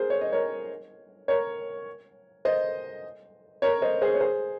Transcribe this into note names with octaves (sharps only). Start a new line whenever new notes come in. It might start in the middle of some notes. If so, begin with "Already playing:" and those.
Already playing: G#4 A#4 C5
C#5
D#5
A#4 C#5
A#4 C#5
C5 D#5
A#4 C#5
C5 D#5
G#4 C5
C#5
G#4 C5